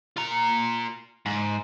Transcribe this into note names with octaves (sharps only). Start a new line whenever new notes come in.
F4 A#5
G#2